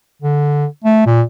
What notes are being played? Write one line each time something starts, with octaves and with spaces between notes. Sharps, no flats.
D3
A3
A#2